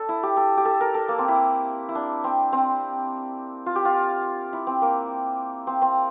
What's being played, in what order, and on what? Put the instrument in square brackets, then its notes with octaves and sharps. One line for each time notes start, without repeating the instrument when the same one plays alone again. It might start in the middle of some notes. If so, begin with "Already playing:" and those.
Already playing: [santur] D4 A4
E4
G4
A4
G4
A4
A#4
A4
A#3
C4
E4
E4
D4
C4
C4
F4
G4
F4
E4
C4
A#3
C4
C4